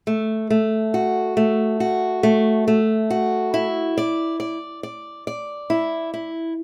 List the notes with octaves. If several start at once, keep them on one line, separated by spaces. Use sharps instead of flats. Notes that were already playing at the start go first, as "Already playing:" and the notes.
A3
A3
F#4
A3
F#4
A3
A3
F#4
E4
D5
D5
D5
D5
E4
E4